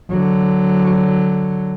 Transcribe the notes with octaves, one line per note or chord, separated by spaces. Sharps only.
D3 F#3